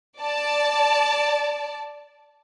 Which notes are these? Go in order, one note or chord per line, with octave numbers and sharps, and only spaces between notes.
D5 A5